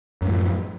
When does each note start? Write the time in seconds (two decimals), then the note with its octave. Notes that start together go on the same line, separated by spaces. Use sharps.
0.22 F#2
0.26 A2
0.30 F3